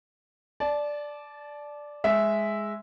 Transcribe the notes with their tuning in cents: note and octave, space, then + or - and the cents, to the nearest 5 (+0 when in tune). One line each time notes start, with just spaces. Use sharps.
D5 +0 A5 -25
G#3 +0 E5 -5